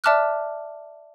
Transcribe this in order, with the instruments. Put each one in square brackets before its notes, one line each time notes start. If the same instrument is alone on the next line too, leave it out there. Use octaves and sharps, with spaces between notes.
[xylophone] D5 E5 A5 D6 F6 F#6